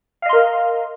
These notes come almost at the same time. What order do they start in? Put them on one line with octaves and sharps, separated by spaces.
F5 D#5 C6 A#4